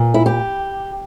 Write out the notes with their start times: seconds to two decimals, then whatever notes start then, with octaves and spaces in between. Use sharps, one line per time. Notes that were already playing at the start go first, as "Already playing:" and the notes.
Already playing: A#2
0.14 E4
0.26 G4